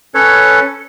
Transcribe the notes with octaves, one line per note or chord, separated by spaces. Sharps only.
C#4 A4 B4 C#5